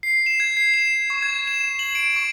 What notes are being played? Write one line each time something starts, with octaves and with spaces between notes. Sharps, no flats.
C7
E7
G#6
C7
E7
C#6
G#6
E7
F#7
D7
C#6